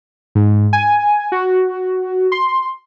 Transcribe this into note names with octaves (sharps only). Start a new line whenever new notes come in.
G#2
G#5
F#4
C6